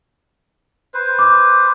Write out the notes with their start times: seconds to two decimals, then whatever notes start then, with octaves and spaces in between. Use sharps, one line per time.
0.94 B4 C5
1.19 D6